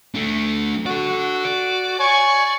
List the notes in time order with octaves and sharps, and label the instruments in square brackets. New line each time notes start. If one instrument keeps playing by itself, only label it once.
[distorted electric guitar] A3 D4
[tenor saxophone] F#4 [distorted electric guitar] A4 D5
[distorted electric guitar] D5
[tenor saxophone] C#5 [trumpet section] G#5 C#6